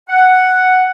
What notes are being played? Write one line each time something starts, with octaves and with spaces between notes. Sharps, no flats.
F#5